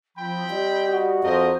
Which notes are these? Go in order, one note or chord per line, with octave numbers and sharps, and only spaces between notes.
F3 C4 G5 B5
G3 D#5
F#4
F2 E4 A#4 C5 D#5